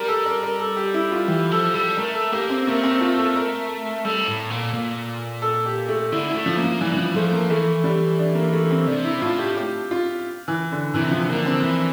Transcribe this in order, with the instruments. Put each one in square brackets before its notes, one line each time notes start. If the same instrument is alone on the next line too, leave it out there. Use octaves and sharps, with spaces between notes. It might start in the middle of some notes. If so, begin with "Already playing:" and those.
Already playing: [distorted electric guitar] G3 [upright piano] A#4
[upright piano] A4
A#4
A#4
A4
G4
E4
F4
[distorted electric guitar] E3 [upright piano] G4
[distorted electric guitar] F3 [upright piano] A4
[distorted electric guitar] G3 [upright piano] A4
[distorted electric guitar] A3 [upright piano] A#4
[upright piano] A4
[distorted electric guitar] A#3 [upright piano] G4
[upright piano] C4
[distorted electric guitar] A3 [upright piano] A#3
[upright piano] C4
F4
A4
A#4
[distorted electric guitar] G3 [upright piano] A4
[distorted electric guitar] A2
A#2
A#2
[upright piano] A4
G4
A3
[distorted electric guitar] D3 [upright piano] E4
[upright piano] E4
[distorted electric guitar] A3
[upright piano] F3
[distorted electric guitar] A#3
[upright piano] F3
[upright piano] E3 [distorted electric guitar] G3
[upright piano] E3
F3
[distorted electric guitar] F3 [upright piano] A3
[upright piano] A#3
[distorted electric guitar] E3 [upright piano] A3
[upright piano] G3
D4
A#3
A3
C4
[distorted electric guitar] C3 [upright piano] D4
[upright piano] E4
[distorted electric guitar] A2 [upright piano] F4
[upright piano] G4
G4
F4
E3
D3
[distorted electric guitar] C3 [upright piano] E3
[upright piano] F3
[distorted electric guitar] D3 [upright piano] A#3
[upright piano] C4
[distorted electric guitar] E3